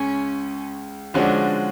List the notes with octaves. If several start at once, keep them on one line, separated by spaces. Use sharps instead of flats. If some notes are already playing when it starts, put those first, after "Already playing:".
Already playing: C#2 C#3 G#3 C#4
D3 F3 G#3 C#4 D4 F#4